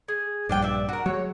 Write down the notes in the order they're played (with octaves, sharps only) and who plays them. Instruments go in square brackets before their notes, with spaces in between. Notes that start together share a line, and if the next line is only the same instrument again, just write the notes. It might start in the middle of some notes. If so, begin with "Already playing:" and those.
[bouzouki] G#4
[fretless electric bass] A#1 G2 [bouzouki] D4 F4 G5
[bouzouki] D5 E5
F#4 A#4
[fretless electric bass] F#3 G#3 [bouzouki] C#5